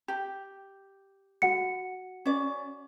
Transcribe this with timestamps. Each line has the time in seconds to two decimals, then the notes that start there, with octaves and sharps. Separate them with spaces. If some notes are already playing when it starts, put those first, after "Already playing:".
0.08 G4
1.42 F#4 F#5 C#7
2.25 C#4 D5